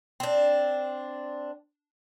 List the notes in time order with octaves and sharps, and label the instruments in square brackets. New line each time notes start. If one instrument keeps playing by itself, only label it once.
[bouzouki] C4 D4